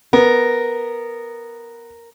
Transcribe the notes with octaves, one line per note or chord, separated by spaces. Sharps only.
B3 A#4